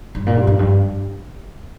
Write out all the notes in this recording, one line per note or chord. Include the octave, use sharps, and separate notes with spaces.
G2
A#2
G2
F2
G2